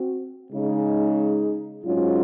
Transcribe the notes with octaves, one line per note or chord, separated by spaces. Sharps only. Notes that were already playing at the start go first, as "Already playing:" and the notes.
Already playing: C4 F#4
C#3 G#3 D#4 G#4
G#2 F#3 C#4 F4